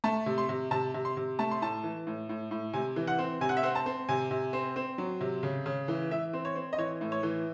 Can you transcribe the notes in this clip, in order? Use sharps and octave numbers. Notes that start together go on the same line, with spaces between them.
A3 A5
C3
C6
C3
C3 A5
C3
C6
C3
A3 A5
C6
A2 A5
E3
A2
A2
A2
C3 G#5
E3
F#5
C4
C3 G#5
F#5
E5
C4 F#5
A5
C4
C3 G#5
C3
C4
C4
F#3
C3
C#3
C#3
E3
E3 E5
C4
C#5
C4
D#5
E3 C#5
A2
C#5
E3